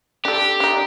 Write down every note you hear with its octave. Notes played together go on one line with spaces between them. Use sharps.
D4 G4 A4
D4 D#4